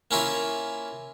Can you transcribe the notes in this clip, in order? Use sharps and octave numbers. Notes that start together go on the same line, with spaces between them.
A#3 C#4 E4 F4 A#4